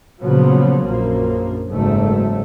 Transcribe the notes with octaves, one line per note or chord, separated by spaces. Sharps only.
A#2 C#3 F3 F#3 B3
A#1 F#2 F3 A#3
F#1 G#2 A3